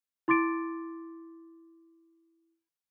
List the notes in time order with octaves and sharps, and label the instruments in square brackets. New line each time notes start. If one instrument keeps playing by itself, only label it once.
[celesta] E4 C6 D6 A6 D7